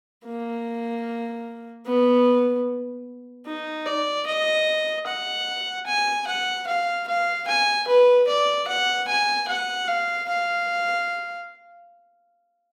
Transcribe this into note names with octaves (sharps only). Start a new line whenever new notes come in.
A#3
B3
D#4
D5
D#5
F#5
G#5
F#5
F5
F5
G#5
B4
D5
F#5
G#5
F#5
F5
F5